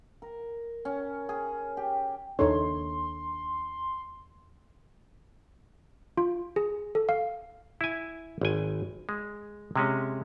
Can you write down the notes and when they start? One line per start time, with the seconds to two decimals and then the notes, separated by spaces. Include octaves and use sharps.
0.22 A#4
0.85 C#4
1.29 G#4
1.77 G4
2.39 D#2 D4 D#4 A4 C#5 C6
6.17 F4
6.56 G#4
6.95 A4
7.09 F5
7.81 E4 G#5
8.41 G#1 G#5
9.09 G#3
9.76 C3 G#3 C#4